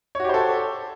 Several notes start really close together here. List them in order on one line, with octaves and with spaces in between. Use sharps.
C#5 F#4 G4 C5 A4